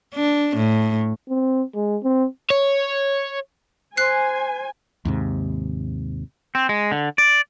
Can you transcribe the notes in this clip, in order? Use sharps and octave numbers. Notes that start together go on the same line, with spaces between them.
D4
A2
C4
G#3
C4
C#5
C5 G#5 F#6 C7
D#2 G#2 C3
C4
G#3
D3
D5